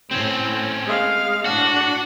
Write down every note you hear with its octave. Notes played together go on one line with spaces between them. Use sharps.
A2 C4 C#4
G#3 F5
A2 D4 F#4 F#5